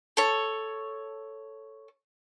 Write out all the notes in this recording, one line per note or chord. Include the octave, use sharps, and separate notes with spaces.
A4 C#5